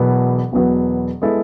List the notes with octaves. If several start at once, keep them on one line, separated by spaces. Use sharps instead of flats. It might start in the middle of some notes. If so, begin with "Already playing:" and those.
Already playing: E1 E2 B2 F#3 B3
E1 E2 B2 F#3 B3
G#3 B3 E4 A4